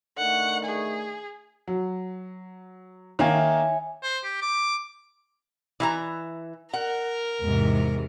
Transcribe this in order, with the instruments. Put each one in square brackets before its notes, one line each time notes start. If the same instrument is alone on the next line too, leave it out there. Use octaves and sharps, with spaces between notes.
[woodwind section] D3 D#3 A3 [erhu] F#5
[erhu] G#4
[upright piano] F#3
[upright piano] D#3 A#3 [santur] C#5 E5 G#5
[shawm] C5
G4
D6
[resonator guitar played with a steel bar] E3 E5 A#5
[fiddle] A#4 [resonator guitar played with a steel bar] F#5
[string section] E2 G#2 C3